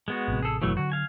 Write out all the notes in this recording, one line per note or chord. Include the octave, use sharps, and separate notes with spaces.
G#3 B3 F#4
A1 C3
G#4 A4
F#1 B2 E3 F#3 A3
D3 F#3 F#4
F5 G#5